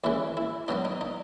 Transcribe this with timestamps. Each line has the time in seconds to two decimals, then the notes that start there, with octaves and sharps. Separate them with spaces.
0.04 D#2 C#3 E3 E4
0.37 E4
0.68 B2 F#3 B3 D#4
0.85 D#4
1.01 D#4